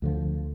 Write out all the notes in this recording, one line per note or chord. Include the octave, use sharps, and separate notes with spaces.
D2 D3 F3